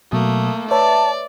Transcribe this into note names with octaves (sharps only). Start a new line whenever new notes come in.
B2 F#3 A3 A#3 D#6
B4 C#5 D5 E5 A5